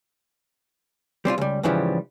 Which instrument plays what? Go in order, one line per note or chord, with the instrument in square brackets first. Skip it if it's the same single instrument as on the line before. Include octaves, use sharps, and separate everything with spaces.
[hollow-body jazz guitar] G3 C4 C#4 F4
C#2 G3
G#2 C#3 E3 F3 G3